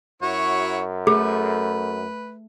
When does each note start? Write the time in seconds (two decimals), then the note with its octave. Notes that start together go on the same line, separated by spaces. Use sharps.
0.22 F#2 E4 F#4 C#5
1.07 A3 G#4 B4